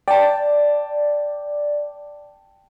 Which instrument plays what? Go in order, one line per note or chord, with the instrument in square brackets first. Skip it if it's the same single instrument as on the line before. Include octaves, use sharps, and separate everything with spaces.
[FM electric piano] D5 [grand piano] G5 A5